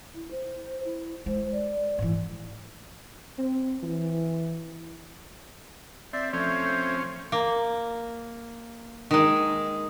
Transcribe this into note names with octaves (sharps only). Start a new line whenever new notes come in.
E4
C5
E4
G#3 C5
D5
G#2 E3
C4
E3
C4 D5 E5
F3 A3 C4 C#4 C5 C#5
A#3
D#3 G#3